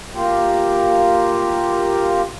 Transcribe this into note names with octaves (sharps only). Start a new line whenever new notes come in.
A#3 F4 G4